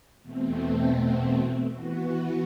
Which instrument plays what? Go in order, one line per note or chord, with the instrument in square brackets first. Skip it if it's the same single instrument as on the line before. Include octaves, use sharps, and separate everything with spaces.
[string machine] E2 B2 A3 C4
E3 B3 F#4